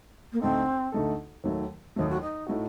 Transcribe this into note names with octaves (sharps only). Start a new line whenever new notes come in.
A#3
D2 D3 A3 C4 D#4 A4
D2 D3 A3 D#4 A4
D#2 D#3 F#3 A3
D#2 D#3 F#3 A3 D#4
F#4
D#4
A2 A3 D#4 F#4